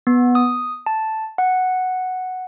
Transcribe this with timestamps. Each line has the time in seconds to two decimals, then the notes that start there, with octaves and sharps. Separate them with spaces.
0.07 B3
0.35 D#6
0.86 A5
1.38 F#5